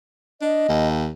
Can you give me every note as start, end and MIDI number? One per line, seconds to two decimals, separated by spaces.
0.41 0.68 62
0.41 0.88 75
0.69 1.09 39